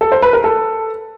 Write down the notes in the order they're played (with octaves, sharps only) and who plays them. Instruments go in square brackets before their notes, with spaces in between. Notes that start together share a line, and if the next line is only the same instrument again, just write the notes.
[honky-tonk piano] A4
C5
B4
A#4
A4